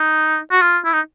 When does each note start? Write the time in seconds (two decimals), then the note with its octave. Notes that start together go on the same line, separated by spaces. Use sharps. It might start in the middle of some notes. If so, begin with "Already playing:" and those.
Already playing: D#4
0.52 F#4
0.62 F4
0.85 E4
0.93 D#4